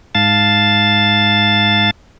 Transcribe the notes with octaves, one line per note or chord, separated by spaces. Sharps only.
G#2 F5 A5 A6